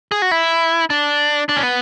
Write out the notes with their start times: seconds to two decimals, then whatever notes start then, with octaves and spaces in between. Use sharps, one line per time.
0.12 G#4
0.22 F#4
0.31 E4
0.90 D4
1.49 D4
1.56 C#4
1.63 B3